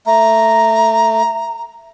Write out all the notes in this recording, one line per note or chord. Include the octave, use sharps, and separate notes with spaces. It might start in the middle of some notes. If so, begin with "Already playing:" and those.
A3 A#5